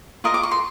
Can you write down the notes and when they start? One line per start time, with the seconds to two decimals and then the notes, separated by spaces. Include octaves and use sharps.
0.24 F4 A#4 D#5 D#6
0.34 D6
0.43 C#6
0.51 C6